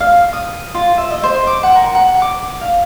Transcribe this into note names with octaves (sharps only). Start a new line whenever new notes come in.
F5
D#6
F4
E5
D#5
C5
D6
F#5
A#4
F#5
D6
F5